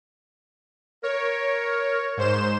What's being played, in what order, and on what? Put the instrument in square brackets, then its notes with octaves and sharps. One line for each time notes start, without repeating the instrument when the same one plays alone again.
[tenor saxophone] A#4 [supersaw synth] C#5
[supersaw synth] G#2 C5 E7